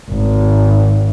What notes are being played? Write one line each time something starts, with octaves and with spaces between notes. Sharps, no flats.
G#1